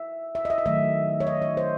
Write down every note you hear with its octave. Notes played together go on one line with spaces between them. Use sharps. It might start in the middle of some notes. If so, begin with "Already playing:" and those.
Already playing: E5
E5
D#5
E5
D#5
D#3 F#3 A3 E5
C#5
D#5
C#5
C5